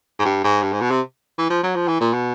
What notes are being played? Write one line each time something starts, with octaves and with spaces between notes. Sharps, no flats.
G#2
G2
G#2
G2
G#2
B2
C3
E3
F3
F#3
F3
E3
A#2
B2